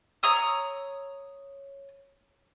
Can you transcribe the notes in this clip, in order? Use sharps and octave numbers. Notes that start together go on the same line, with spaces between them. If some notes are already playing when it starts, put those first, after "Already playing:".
C#5 A#5 D#6 E6